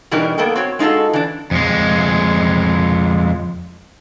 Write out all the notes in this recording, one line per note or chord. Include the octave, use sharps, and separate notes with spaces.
B2 E3 G3 D4 D#4 A#4
A#3 B3 A4 A#4 G5
C4 F#4 C#5
G#3 D#4 F4 F#4 A4
E3 D4
F2 G#3